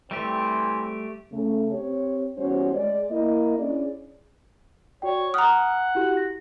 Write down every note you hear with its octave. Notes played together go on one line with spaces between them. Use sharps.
E3 G3 A3 C4 G4
C#3 A3
C4 G4 C#5
E2 G3 C#4 F#4 C5 C#5
G#3 D5
A#3 E4 D#5
C#4 D4 E4 G#4 D5
F#4 C#5 D5 G5
F#5 A#5 D#6 F6
E4 F#4 G4
A#6